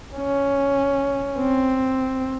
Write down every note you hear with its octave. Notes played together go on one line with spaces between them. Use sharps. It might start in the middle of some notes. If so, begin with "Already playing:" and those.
C#4
C4